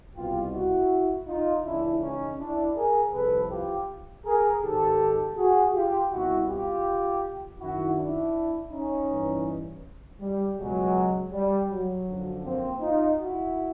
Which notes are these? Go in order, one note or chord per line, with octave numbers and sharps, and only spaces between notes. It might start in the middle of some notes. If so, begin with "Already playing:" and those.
C2 B2 F4 G4
E4 F#4
D#4 F4
C#2 C#3 E3 D4 E4
C#4 D#4
D4 E4
G#4 A#4
C2 C3 F3 A4 B4
F4 G4
G#4 A#4
G#2 D#3 G4 A4
F#4 G#4
F4 G4
C2 B2 E4 F#4
F4 G4
F#2 D#3 E4 F#4
D4 E4
C#4 D#4
G2 E3
G3
C#2 B2 F#3 G#3
G3
F#3
F#2 D3 F3
A#3 C4
D#4 F4
E4 F#4